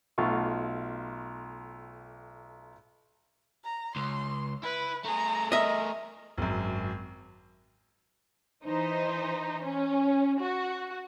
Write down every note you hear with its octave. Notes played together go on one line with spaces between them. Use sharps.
B1 A3 F4 F#4 C#6
A#5
C#2 C6
E4 B4
A3 G#4 A#5
A#4 D#5 E5
G#1 F#2
E3 D#4 C5
C#4
F#4